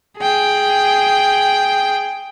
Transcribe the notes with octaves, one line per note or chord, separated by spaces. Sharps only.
G#4 G5